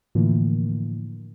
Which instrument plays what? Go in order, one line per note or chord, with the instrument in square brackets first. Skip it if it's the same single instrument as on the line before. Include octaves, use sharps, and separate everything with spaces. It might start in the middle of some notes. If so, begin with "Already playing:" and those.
[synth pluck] A2 D3 E3 F3 A#3